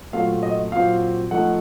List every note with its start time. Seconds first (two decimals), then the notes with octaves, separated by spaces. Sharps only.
0.13 A#2 F#3 A3 C4 F4 F5
0.43 D#5
0.72 A#2 F#3 C4 F5
1.31 F3 A3 D#4 F#5